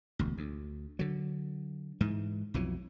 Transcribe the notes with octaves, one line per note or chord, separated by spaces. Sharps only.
E1 D2
D2
D3 F#3
G#2 E3
B1 F2 E3 F#3